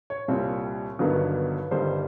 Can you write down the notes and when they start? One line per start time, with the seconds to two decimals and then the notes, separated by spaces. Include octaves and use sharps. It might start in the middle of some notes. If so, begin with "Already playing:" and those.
0.10 C#5
0.28 C2 A#2 G3 C4
0.99 G1 G2 D#3 F#3 B3
1.71 G1 G2 D#3 G3 C5